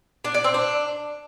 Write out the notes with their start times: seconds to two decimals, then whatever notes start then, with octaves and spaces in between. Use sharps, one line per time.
0.25 D4
0.34 D5
0.44 C4
0.54 D4